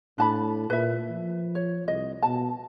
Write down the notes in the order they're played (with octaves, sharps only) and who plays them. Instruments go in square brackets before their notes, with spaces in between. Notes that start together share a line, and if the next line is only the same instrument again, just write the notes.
[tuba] A2 [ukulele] D4 A5 B5
[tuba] A#2 [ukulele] B4 E5
[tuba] F3
[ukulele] C#5
[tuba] C2 [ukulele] D#5
[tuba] B2 [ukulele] A5